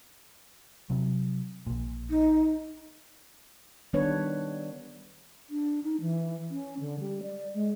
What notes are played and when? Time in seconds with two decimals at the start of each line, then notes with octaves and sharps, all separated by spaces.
0.90 C3 F#3
1.67 A#1 A#2
2.10 D#4
3.93 D#3 G3 B3 D4 B4 C#5
5.50 D4
5.83 D#4
6.00 E3
6.50 C#4
6.80 D3
7.00 G3
7.23 D5
7.54 G#3